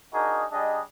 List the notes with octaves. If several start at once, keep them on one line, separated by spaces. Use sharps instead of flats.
D4 D#4 F#4 G#4 A#4 D#5
G3 D4 G#4 D#5